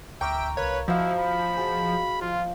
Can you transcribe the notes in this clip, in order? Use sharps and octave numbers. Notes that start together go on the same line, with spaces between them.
D2 E5 G5 A#5 C#6 D6 F6
C2 A#4 B4 C#5 F5
F3 E4 F#4 D#5 F5
B5
F#4 G#4
F3 F4